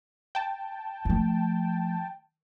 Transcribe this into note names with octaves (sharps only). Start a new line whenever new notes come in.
G5 A5
F3 A3